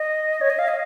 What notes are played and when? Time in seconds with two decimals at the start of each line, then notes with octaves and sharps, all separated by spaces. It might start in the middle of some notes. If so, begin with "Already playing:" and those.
Already playing: D#5
0.41 C#5
0.50 D#5
0.59 F5
0.68 D#5